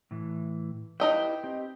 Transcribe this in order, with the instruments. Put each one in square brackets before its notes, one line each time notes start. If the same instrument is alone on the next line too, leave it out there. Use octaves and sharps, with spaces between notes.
[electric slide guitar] A2 E3
[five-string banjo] D#4 D#5 G5 [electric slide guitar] E4 G4 B4
[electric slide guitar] C4 G4